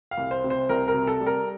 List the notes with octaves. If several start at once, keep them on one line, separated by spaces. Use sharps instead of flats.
F5
C2
C5
C3
C5
C2 A#4
A#4
C3
A4
G3
A#4